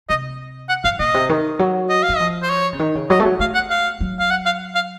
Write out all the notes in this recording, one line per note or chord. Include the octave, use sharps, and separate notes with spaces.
C3 D#5
F#5
F#2 F5
A#2 D#5
C3
D#3
F#3
D#5
F5
F#3
F3 D#5
C5
C#5
C#3
D#3
C#3
F#3 D#5
A3
F#3
A3 F5
F#5
F5
F#3
F5
F#5
F5
F5